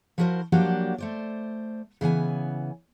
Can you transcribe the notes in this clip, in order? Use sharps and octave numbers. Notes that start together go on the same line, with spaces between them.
F3 E4 F#4 A#4 C5 A5
F3 F#3 A#3 D4 F#4 G4
A3 C5 D5
C#3 E3 B3 G#5